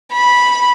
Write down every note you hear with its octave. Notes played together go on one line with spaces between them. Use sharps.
B5